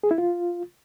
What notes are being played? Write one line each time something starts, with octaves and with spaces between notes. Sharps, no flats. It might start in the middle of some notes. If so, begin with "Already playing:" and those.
G#4
E4
F4